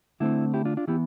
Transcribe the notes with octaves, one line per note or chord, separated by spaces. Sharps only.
D3 A3 C4 E4
E4 G4
D4 F4
D4 F4
E3 B3 E4 G4